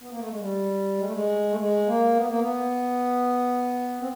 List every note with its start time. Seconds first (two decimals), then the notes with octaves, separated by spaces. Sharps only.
0.01 B3
0.10 A#3
0.19 A3
0.30 G#3
0.39 G3
0.98 G#3
1.05 A3
1.13 G#3
1.50 A3
1.58 G#3
1.87 A#3
2.16 B3
2.28 A#3
2.39 B3
4.00 C4